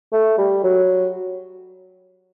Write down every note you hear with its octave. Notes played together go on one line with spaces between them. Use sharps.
A3
G3
F#3